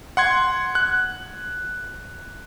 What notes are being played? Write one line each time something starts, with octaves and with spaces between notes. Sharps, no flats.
F#5 C6 G#6
F#6